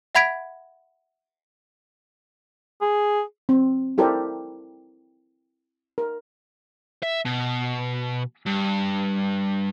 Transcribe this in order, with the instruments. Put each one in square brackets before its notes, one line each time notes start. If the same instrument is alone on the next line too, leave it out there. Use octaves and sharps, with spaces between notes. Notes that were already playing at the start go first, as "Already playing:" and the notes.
[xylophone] E5 F#5 B5 G#6 B6 D7
[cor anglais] G#4
[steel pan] C4
E4 G4 A4 A#4 C5 D5
A#4
[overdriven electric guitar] E5
B2
G2